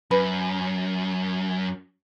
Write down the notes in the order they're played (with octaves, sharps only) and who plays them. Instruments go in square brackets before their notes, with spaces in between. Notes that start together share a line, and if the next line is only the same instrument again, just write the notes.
[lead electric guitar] F#2 [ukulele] B4